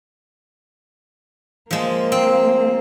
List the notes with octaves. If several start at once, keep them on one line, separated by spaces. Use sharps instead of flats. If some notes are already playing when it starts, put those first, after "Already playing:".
F3 G#3 A#3
C4